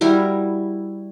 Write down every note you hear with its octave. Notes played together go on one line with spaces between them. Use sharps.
G3 E4 F#4 A#4